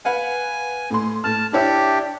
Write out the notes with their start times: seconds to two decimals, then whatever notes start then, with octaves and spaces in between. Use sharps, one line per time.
0.05 B4 F5 F#5 G#5
0.90 A2 C6
1.24 A2 A5 F6
1.53 D4 E4 G4 C#5 E5